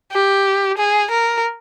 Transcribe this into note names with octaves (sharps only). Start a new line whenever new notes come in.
G4
G#4
A#4